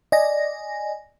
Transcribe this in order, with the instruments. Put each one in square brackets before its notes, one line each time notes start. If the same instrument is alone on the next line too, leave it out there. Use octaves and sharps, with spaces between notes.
[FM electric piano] D5 D#5 G#5 A#6